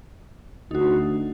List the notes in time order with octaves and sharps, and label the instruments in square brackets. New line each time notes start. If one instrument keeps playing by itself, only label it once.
[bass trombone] D2 [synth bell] D#4 F#4